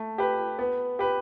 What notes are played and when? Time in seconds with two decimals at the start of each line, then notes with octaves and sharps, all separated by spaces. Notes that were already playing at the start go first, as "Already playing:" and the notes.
Already playing: A3
0.18 G4 B4
0.59 B3
0.99 G4 B4